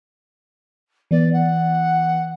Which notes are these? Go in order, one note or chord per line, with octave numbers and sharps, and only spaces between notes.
E3 B3 D5
F#5